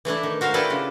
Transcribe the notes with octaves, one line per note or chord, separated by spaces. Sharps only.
E3 A3 D4 E4
D#3
F#4 A#4 C5 F5
D4 E4 G4 A4 B4 D5
C#3 F4